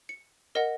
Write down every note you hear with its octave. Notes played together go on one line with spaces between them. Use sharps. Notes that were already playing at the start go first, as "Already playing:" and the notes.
C#7
A#4 D#5 F#5 A#6